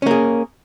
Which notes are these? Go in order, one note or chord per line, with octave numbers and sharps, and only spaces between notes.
A#3 C#4 G#4